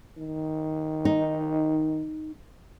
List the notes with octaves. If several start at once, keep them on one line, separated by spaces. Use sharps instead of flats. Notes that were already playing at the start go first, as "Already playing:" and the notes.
D#3
D#4